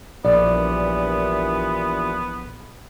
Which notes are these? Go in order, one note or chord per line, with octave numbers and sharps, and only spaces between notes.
A#1 G2 A#2 E3 B3 D5